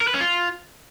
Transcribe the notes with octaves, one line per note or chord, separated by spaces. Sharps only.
A#4
B4
C#4
F4